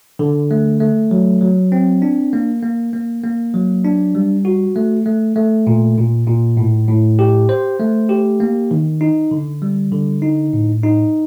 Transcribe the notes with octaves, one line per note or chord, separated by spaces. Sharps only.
D3
A3
A3
F#3
F#3
C4
D4
A#3
A#3
A#3
A#3
F#3
D4
G3
F#4
A3
A3
A3
A#2
A#2
A#2
A2
A2
G4
C5
A3
G4
A#3
D#3
D#4
D3
G3
D3
D#4
A2
D#4